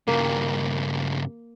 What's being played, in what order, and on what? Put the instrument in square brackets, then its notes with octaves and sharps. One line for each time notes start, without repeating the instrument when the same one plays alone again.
[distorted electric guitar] G2 C#3 [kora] A#3